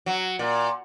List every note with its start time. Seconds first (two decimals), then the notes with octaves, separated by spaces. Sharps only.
0.06 F#3
0.39 A#2